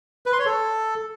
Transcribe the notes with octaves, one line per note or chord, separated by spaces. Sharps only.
B4
C6
C#5
A4